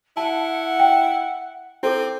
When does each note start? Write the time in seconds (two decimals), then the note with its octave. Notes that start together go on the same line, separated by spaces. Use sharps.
0.17 E4 F#5 A5
0.80 G5
1.83 C4 E4 A4 D6